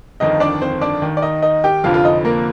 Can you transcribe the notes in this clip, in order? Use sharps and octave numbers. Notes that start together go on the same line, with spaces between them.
G1 F2 D#3 D#4 D#5
D4 D5
C4 C5
D4 D5
D#2 D#3
D5
D#4 D#5
D#4 D#5
G4 G5
F1 F2 D3 F3 F4 F5
F4 F5
D#4 D#5
A#3 A#4